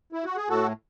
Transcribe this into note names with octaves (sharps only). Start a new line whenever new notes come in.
E4
F#4
G#4
A2 F#4 A4